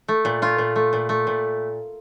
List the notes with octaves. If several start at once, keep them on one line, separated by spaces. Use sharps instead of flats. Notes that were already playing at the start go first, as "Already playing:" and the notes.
A3
A#2
A3 F4
A#2
A3
A#2
A3
A#2